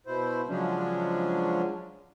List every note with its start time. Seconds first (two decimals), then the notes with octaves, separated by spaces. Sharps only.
0.07 B2 E4 C5
0.49 C#3 F3 F#3 G#3 C#4 D4